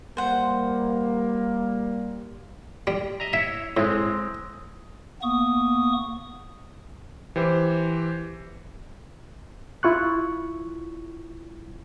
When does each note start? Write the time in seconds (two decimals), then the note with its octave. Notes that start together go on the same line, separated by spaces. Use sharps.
0.17 G3 A#3 C5 F#5
2.87 G3
3.20 D#5 E5 A#5
3.33 E4 C#5 E5
3.77 A2 G#3 C4
5.22 A#3 B3 C#6 D#6
7.36 E3 G4 C5
9.83 E4 F4 C#6 F#6